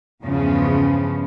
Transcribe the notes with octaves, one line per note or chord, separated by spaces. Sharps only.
E2 G2 C#3 F3 B3